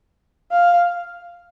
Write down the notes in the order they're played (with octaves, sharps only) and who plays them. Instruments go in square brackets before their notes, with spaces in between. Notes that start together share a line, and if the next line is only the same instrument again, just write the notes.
[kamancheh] F5